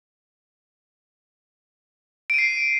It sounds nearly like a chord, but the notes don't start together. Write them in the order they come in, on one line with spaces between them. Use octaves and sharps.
D7 D#7 C7